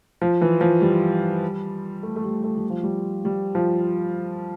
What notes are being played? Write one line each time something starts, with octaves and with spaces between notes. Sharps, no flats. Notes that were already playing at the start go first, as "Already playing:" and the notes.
F3
E3
F3
G3
A3
A3
G3
A3
G3
F3
G3
G3
F3